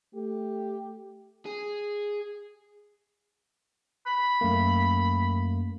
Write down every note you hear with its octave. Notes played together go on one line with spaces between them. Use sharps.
A3 G4
G#4
B5
F#2 A3 A#3